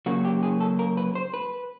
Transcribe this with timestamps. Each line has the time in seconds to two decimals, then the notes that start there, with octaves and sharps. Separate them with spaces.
0.06 C#3 F#3 A#3 F#4
0.25 G4
0.43 G#4
0.60 A4
0.79 A#4
0.97 B4
1.15 C5
1.34 B4